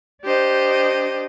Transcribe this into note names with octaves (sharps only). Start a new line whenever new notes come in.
D4 G4 C5 D#5